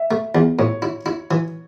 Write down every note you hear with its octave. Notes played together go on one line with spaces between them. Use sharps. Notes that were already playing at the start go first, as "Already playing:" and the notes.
Already playing: E5
A3
E2
A2 C#5
E4
E4
E3